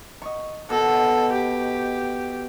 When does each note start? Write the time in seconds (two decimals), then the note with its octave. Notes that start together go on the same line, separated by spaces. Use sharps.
0.22 D#5 C#6
0.70 B2 A4
1.32 G4